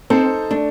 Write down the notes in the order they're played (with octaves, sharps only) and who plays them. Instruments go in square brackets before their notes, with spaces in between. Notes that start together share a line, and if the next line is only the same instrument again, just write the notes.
[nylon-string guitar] C4 [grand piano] D#4 A4 C5
[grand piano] A3 [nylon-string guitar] D4